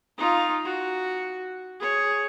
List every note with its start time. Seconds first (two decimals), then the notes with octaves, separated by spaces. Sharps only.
0.17 D#4 F4
0.65 F#4
1.80 G#4 C#5